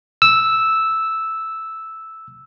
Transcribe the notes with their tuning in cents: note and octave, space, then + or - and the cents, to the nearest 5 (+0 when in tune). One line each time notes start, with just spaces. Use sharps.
E6 -5